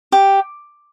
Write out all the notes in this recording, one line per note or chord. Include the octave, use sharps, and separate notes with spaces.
G4